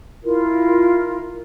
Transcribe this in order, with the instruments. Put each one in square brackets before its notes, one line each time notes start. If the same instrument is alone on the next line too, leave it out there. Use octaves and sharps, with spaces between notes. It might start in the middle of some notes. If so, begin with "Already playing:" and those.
[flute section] E4 F4 A#4